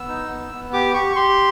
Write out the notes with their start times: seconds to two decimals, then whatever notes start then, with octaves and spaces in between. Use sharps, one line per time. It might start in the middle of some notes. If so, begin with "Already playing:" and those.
Already playing: B3 E6
0.08 D#4
0.29 B3
0.52 B3
0.73 G4 D6
0.94 G4 C#6
1.12 C#6
1.16 G4 C6